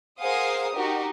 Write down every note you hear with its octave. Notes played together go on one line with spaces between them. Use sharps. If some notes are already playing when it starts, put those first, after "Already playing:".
G#4 A#4 C5 F5 F#5 D#6
D#4 F#4 G4 A#4